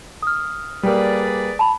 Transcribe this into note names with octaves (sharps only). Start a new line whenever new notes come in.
D#6 F6
G3 A#3 G#4 B4 D5
A5 B5